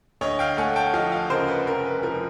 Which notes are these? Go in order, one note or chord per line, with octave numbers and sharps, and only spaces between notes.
D2 C#5 D#5
F5 G5
A3 F#5 G#5
G5 A5
F3 D#5 F5
D#5 F5
C#3 A#4 C5
B4
F1 A#4
B4
F3 A#4